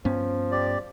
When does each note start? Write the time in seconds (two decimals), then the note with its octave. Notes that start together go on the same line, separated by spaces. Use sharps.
0.05 G2 F3 B3 C#4
0.52 G4 D5